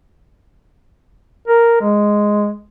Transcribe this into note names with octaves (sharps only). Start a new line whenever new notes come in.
A#4
G#3